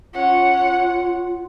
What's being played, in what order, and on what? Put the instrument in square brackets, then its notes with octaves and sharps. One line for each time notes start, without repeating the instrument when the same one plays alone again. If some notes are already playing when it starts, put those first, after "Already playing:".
[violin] C#4 F#5 [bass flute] F4